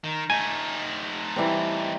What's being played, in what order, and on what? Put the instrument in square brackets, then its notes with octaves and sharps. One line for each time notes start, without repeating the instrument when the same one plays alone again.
[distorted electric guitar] D#3
[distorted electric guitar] A3 D#4 [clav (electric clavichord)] G#5
[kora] E3 G3 C4